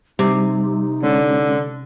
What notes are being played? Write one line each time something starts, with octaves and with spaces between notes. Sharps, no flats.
C3 G3 D#4
D3 G#3 C#4